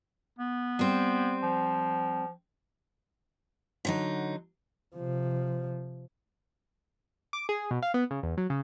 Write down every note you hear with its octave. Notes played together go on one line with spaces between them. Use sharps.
B3
G3 C4
F3
D3 F#3 D#4
C3 F3
D6
G#4
B2
F5
B3
C#3
E2
F#3
C#3